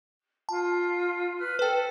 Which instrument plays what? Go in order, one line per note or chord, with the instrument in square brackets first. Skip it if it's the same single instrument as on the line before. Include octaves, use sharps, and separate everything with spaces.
[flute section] F4 [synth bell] A5
[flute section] B4 F6
[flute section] A4 [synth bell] B4 G5